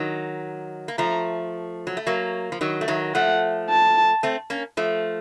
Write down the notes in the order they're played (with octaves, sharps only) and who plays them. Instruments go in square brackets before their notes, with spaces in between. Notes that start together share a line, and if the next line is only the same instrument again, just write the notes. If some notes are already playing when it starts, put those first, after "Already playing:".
Already playing: [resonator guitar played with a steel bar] D#3 F#3
A#3
[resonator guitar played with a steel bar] F3 A3 [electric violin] A#5
[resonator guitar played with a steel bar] F#3
A3
F#3 A#3
F3
D#3 F#3
A3
D#3 F#3
[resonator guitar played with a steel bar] F3 A3 [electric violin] F#5
[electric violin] A5
[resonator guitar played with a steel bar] A3 C4
A#3 C#4
F3 A3